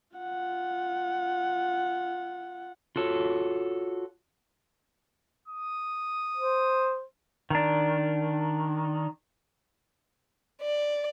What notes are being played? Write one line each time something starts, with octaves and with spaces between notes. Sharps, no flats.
F4 F#5
F4 F#4 A4 C#5
D#6
C5
D#3 D4
D5